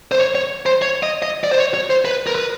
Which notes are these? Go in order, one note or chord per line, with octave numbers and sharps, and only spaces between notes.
C5
C#5
C#5
C5
C#5
D#5
D#5
D5
C5
C#5
C#5
C5
B4
A#4
B4